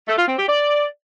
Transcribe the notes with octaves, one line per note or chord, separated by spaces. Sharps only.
A3
F4
C4
G4
D5